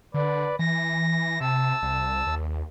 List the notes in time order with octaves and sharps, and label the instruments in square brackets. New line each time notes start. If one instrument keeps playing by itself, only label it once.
[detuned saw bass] D3 [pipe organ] B4 D5
[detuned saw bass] E3 [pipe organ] A#6
[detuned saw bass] C3 [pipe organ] A5 E6
[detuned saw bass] C2
D#2